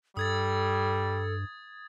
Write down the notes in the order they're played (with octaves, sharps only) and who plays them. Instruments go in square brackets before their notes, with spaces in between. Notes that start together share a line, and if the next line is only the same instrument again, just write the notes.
[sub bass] G2 [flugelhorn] G3 [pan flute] A4 [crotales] D#6 G#6 A6